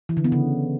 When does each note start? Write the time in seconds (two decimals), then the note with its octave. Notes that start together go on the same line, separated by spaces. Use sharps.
0.09 E3
0.17 D3
0.24 B3
0.32 C#3